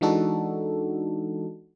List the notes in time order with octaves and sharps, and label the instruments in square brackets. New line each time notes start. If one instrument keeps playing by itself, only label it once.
[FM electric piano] E3 G#3 D4 D#4 F#4 A4